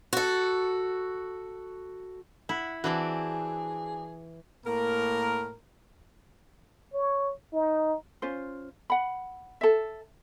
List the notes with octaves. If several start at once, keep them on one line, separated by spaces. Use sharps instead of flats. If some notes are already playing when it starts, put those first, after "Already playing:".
F#4 A4
E4 F#5
E3 C4 D4 F#4 G#4
A2 A#3 A#4
C#5
D#4
C#4 F4 C5
F#5 B5
A4 E5